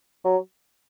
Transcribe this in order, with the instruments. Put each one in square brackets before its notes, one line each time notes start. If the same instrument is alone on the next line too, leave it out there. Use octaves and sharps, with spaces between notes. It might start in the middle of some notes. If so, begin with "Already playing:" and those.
[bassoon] F#3